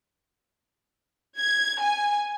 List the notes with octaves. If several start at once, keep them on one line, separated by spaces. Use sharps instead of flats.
G#6
G#5